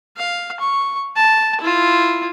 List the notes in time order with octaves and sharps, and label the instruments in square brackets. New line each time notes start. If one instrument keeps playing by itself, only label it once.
[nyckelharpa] F5
C#6
A5
E4 F4